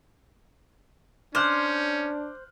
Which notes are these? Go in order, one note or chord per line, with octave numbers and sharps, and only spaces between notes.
C#4 D4 C5 D6 F6 F#6